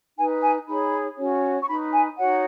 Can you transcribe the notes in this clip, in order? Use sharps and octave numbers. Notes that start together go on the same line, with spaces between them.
D#4 B4 G#5
G#5
D#4 G#4 C#5 B5
C#4 F#4 C#5
C#6
D#4 B4 B5
G#5
D#4 F#4 C#5 F#5